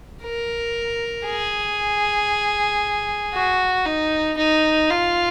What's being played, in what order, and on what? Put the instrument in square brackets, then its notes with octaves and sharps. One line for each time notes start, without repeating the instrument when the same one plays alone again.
[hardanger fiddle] A#4
G#4
F#4
D#4
D#4
F4